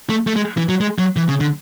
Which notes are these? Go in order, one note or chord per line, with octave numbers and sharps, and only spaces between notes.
A3
A3
G#3
E3
F#3
G#3
F#3
E3
C#3
D3